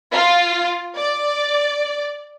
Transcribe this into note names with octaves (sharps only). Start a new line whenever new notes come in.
F4
D5